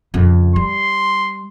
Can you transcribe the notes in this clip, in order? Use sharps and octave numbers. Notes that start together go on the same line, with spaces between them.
F2 C#3
G3 C6